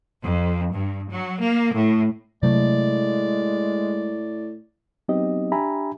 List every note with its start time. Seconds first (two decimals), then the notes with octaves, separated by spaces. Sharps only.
0.25 F2
0.75 G2
1.10 F#3
1.44 A#3
1.75 A2
2.43 A2 C3 F#3 G#3 A3 D5
5.08 F#3 B3 C4 D#4 G4 D#5
5.52 D4 G4 E5 G#5 A#5 B5